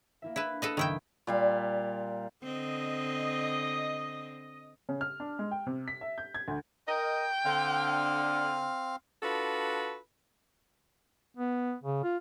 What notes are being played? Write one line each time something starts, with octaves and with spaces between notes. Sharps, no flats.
A#3 E4 E5
D4 E4 B4
A4 B4 D#5
F#1 B1 D#3 E4 G5
A#2 G3 F5
D3 C4 D#5
C#3
F6
D4
G#3
G5
C3
B6
E5
G6
G#6
D2
A#4 D#5 G5
D3 C4 F5 F6
D4 F4 F#4 A4 B4
B3
C#3
F4